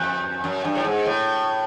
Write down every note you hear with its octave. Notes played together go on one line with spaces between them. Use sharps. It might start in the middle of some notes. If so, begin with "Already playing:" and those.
Already playing: F2 F#6 G6
F#2
G2
A2
G#2
A2